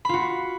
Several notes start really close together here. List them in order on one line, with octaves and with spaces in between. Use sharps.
B5 F4 F#4